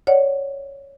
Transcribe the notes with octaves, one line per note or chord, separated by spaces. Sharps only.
C#5 D5 F#5